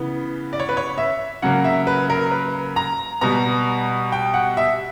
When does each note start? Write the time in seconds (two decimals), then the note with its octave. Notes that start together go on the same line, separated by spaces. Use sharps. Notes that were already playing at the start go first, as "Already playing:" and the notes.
Already playing: C#3 E3 B3
0.53 D5
0.60 C#5
0.69 B4
0.77 C#5
0.98 E5
1.42 C#3 F#3 A#3 F#5
1.65 E5
1.87 B4
2.10 A#4
2.31 B4
2.76 A#5
3.21 B2 G3 B3 A#5
4.12 G5
4.34 F#5
4.57 E5